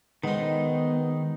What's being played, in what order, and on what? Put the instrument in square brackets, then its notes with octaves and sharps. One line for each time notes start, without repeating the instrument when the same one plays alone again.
[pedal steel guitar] D#3 D#4 [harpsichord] G#3 C4 [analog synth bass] B3